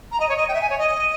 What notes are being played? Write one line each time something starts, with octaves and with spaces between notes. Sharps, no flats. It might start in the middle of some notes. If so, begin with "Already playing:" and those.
A#5
D#5
C#5
D#5
G5
E5
G#5
C#5
D#5